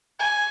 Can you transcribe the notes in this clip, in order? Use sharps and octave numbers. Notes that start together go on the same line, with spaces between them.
G#5